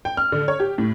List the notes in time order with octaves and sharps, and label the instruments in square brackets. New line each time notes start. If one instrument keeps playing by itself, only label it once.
[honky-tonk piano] G5
F6
D3
C#5
G4
A2